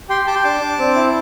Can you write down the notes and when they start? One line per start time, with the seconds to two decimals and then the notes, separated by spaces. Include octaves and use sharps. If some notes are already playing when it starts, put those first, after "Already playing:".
0.10 G4 G5 C6
0.27 G4 A5 D6
0.35 G5 C6
0.43 D4 A5 D6
0.61 D4
0.79 C4
0.95 E4